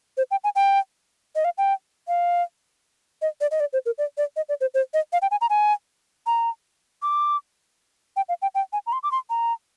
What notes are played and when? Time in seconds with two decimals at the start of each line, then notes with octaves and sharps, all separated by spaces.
0.18 C5
0.31 G5
0.44 G#5
0.56 G5
1.36 D#5
1.45 F5
1.58 G5
2.08 F5
3.22 D#5
3.41 D5
3.51 D#5
3.60 D5
3.73 C5
3.86 A#4
3.98 D5
4.18 D5
4.36 D#5
4.49 D5
4.61 C5
4.74 C5
4.94 D#5
5.13 F5
5.22 G5
5.31 G#5
5.41 A#5
5.50 G#5
6.27 A#5
7.02 D6
8.16 G5
8.29 F5
8.42 G5
8.55 G5
8.73 G#5
8.86 A#5
8.92 C6
9.03 D6
9.12 C6
9.30 A#5